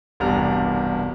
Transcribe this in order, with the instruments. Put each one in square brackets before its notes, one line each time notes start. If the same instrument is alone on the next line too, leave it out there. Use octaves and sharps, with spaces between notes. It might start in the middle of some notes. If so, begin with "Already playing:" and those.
[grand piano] E1 C2 G2 G4 A#5 F6